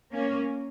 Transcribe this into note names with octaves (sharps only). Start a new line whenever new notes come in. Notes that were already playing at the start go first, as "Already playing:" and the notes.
A#3 C#4